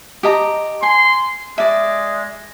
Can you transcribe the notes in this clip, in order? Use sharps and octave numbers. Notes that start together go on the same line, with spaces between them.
G4 D#5 A#5
G#5 C6
G#3 D5 E5